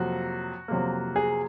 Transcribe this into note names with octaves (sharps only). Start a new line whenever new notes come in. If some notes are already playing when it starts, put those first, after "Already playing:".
Already playing: F2 C3 F#3 A#3 F#4
F2 C3 F#3 A#3
G#4